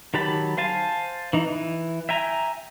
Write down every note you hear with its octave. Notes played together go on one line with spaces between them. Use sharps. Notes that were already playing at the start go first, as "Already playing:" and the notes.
D#3 F#3 G4 A5 B5
C5 F5 G#5 A5
E3 D#4
E3
E5 G5 G#5 A#5